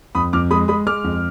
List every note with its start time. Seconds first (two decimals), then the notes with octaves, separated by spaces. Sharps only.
0.15 F2 B5 D#6
0.33 F2 D6 F6
0.51 G#3 B5 D#6
0.68 G#3 B5 D#6
0.86 G#3 D6 F6
1.04 F2